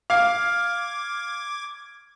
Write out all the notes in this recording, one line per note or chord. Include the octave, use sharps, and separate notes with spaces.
F5 D6 G#6